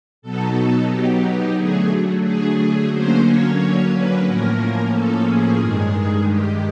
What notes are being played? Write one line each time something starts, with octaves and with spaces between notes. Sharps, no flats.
B2 F#3 B3 D#4 A4
G4
D3 F#3 A3 G#4
G#4
D3 F#3 A#3 C#4 C5
C#5
B4
A2 F3 A#3 C#4 A#4
A4
G#4
G2 D#3 G#3
G4